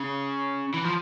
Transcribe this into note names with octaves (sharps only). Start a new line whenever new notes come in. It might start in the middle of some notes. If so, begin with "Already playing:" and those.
Already playing: C#3
E3
F3